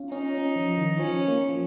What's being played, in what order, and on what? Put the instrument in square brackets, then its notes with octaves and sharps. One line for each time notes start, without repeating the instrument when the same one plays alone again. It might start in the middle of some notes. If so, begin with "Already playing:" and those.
Already playing: [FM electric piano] C#4 F4
[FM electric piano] C#4 [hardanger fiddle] D#4
[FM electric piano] C#4
F3
D#3
[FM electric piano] F3 [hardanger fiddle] C#4
[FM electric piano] A#3
F3